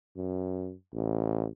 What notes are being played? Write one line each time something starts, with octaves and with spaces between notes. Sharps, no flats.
F#2
A1